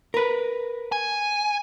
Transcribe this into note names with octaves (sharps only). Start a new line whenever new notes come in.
A#4 B4
G#5